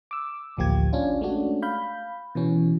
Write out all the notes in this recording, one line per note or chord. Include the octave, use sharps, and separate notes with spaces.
D6 E6
A1 D2 F3 A#3 G4 G#6
C#4 D4 F4
G#3 A3 C#4 D4 F#4
F5 B5 G6
B2 E3 C#4